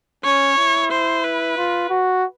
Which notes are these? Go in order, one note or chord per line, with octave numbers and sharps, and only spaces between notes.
C#4 C#5
E4
C5
B4
F4
F#4